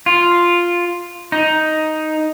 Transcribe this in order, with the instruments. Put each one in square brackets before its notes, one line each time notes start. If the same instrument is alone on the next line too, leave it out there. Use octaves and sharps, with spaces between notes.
[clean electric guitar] F4
D#4